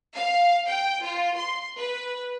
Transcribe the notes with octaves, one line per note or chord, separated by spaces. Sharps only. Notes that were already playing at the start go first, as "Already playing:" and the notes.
F5
G5
F4
C6
B4